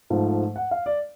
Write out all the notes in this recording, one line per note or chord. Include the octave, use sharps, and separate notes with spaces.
G#2 F3 A3
F#5
F5
D5